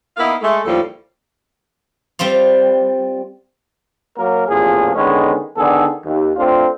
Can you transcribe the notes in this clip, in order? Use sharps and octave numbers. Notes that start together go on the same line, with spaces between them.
A#3 B3 D#4 E4 F5
G#3 A3
D#2 A2 F3 G3 A4
G3 C4 F4 F5
F#3 A#3 A#4
A1 E2 A#2 F3 G#4
D3 D#3 G#3 B3 C#4
D3 D#3 B3 G#4 A4
D#2
A3 C4 D4 F4